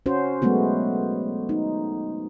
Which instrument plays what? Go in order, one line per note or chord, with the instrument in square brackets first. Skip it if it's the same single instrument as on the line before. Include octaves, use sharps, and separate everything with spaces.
[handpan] C#4 F#4 C5
F#3 G#3 A3 B3 F#4
D#4